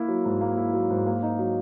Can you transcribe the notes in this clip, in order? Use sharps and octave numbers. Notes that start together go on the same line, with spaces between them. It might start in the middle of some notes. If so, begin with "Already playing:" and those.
Already playing: A#3 E4
F#3
G#2
A#3
E4
F#3
G#2
A#3
D#4
F#3